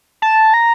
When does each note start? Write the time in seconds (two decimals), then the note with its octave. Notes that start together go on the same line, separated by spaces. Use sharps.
0.22 A5
0.54 A#5